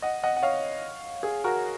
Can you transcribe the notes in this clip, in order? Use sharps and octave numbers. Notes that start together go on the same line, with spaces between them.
D#5 F#5
D#5 F#5
F#5
C#5 F5
G#4
F#4 A#4